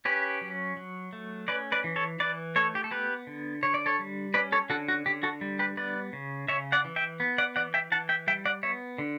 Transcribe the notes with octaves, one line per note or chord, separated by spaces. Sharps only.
C#4 G4 B4
F#3
F#3
A3
C#4 B4 D5
B4 D5
E3
A4 C#5
E3 B4 D5
A3 A4 C#5
G4
A4
B3 G4 B4
D3
D3 C#5
D5
A4 C#5
G3
C#4 B4 D5
A4 C#5
D3 F#4 A4
F#4
D3 G4
F#4 A4
G3
G4 B4
B3 B4 D5
C#3
C#3 C#5 E5
D5 F#5
E3
E5 G5
B3
D5 F#5
E3 D5 F#5
E5 G5
E3 F#5 A5
E5 G5
G3 E5 G5
D5 F#5
B3 C#5 E5
D3